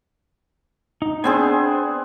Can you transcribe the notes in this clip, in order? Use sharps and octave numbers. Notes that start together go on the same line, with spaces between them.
D#4
B3 C4 D4 G#4 C5 G#5